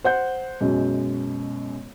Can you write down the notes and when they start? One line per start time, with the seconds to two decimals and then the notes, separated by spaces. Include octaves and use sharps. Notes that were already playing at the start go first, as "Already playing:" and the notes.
0.04 C5 F#5 G6
0.60 F#2 B2 G#3